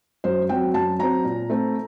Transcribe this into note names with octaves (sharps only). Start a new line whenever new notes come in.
F#2 C5
F#3 C4 G5
F#2 A5
F#3 C4 A#5
A#2
A3 C4